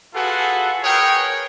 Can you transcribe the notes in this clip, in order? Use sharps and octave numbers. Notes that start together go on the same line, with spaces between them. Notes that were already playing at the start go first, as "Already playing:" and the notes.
F4 F#4 G#4 A4 B4 F#5
G#4 A#4 B4 C#5 G5